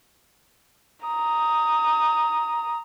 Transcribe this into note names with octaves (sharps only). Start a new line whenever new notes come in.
A#5 D#6